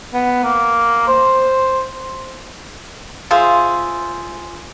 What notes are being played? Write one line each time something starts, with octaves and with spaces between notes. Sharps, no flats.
B3
A#3
C5
F4 G#4 C5 E5